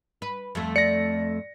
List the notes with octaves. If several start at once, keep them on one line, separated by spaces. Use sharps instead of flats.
B4
F2 A3
D5 A#6 C#7